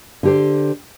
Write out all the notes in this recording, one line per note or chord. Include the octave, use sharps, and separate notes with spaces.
D3 G4 C5